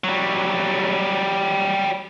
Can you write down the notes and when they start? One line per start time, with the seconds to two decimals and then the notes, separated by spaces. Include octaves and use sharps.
0.04 F#3 G3